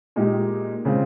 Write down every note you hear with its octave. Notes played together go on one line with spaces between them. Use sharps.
A#2 G#3 D#4 G4
C#3 G#3 C4 F4